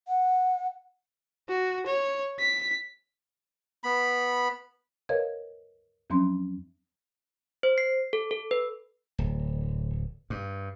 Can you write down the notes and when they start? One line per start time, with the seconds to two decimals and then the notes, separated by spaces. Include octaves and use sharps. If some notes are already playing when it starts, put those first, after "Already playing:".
0.08 F#5
1.49 F#4
1.87 C#5
2.40 B6
3.83 B3 B5
5.09 A#4 B4 C#5 D#5 F5 G#6
6.10 F2 F3 F#3 C4 C#4 C6
7.63 C5
7.78 C7
8.13 A4
8.31 A4
8.51 B4
9.18 D1
10.30 G2